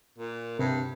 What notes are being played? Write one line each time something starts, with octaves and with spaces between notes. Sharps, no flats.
A#2
G2 C3